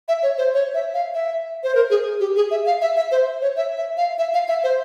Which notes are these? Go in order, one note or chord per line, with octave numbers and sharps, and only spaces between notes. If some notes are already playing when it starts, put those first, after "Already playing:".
E5
C#5
C5
C#5
E5
F5
E5
C5
A#4
G#4
G4
G#4
E5
F5
E5
E5
C5
C#5
E5
E5
F5
E5
F5
E5
C5